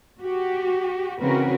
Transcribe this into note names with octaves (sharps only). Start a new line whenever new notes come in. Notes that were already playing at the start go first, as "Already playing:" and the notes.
F#4 G4
C#3 E3 C4 F#4 A#4 B4